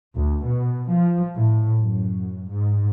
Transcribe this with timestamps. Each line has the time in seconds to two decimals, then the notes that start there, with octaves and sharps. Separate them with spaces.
0.14 D2
0.44 B2
0.89 F3
1.35 A2
1.80 F#2
2.49 G#2